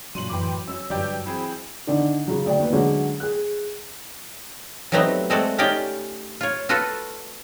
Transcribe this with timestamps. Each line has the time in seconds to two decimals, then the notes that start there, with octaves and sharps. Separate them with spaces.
0.15 A#2 F#3 D4 C6 D#7 F#7
0.29 F#2 A2 E3 G5 B5 D6
0.68 C#4 F#4 C#5 E6
0.90 G2 D3 F#3 D4 G4 D5
1.26 E3 C4 G#4 G5 B5
1.87 D3 D#3 D4
2.27 C#3 F#3
2.45 D2 D5 G5
2.59 D#2 B4
2.72 D3 F#3 G#3 C#4 F#4
3.20 G#4 F#6
4.92 F#3 G3 A3 B3 C4 D#4
5.30 G#3 A3 C4 F#4 A4 D5
5.58 C#4 D#4 F4 G4 D5 G5
6.41 F4 C#5
6.69 F4 F#4 A4 B4 F#5